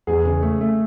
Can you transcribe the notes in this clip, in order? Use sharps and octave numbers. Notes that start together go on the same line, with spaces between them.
E2 G#4
C#3
A3
A3